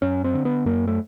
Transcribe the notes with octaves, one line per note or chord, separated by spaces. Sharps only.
F#2 C#4
C4
D3
B3
F#2 A#3
A3